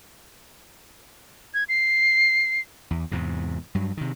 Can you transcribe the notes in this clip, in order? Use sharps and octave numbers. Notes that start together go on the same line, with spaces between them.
G#6
C7
E2
E2 G#2 C3
G2 F#3
C3 D#3